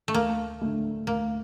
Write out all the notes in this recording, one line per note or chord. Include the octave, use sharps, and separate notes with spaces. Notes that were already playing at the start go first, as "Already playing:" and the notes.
A3
D2 A#3
D3 A3
D2 A#3